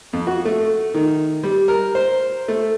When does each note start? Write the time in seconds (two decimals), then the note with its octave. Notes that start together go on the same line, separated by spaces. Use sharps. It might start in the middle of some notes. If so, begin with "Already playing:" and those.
0.13 F2
0.27 F#4
0.45 A3
0.94 D#3
1.44 G3
1.68 A#4
1.95 C5
2.48 A3